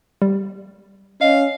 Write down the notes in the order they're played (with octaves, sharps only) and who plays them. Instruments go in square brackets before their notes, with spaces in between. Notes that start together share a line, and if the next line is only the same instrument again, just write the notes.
[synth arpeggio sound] G3
[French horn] C#4 [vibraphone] D#5 [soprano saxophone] F5